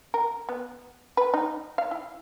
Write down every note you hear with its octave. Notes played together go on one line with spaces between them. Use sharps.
A#4
B3
B4
D#4
F5
E4